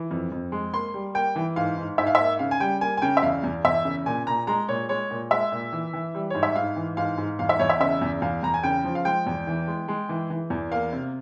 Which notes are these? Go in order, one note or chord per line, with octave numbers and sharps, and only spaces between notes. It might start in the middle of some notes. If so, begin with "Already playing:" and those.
Already playing: E3
F2
F2
G#3
A#3 C6
G3
A#3 G5
E3
G#2 F5
G#2
G#2 E5
F5
A#3 E5
C#3 F5
G#5
G3 G5
A#3 G#5
G#5
C#3 G5
E5
E2 F5
E2
E2 E5
C#3
A#2 G#5
A#2 A#5
G#3 A#5
A#2 C#5
G#3 C#5
A#2
G#3 E5
A#2
E3
E3
G3
G#2 C#5
E5
G#2 F5
E3
G#2 F5
G#2
E2 F5
E5
E2 C#5
E5
C#3 E5
E2
E2 F5
E2 A#5
G#5
C#3 G5
F3
F5
G#3 G5
E2
E3
G#3
G#3
E3
E3
E2
A#3 F5
C3